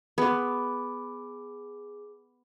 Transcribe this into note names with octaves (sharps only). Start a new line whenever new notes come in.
B3 G#4 D6